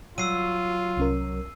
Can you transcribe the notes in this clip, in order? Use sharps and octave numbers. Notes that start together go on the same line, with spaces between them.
F#3 F4 E6 C7 D#7
C2 C#4 A#4